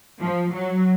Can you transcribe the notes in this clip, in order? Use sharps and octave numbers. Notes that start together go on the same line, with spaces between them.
F3
F#3